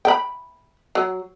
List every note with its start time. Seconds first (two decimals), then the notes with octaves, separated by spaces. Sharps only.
0.05 G5 B5
0.95 F#3